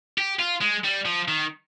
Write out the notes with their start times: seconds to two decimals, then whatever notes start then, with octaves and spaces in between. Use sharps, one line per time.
0.18 G4
0.39 F4
0.61 G#3
0.84 G3
1.05 F3
1.28 D#3